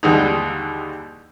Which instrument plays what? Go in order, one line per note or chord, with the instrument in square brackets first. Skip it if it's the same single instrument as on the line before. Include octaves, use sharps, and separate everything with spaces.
[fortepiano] D#2 D3 E3 G3 G#3 D#4